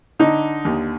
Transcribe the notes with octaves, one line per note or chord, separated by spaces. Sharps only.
D3 D#4
D#2